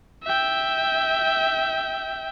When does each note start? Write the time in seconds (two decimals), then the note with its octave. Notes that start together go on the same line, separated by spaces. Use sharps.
0.23 E5 G5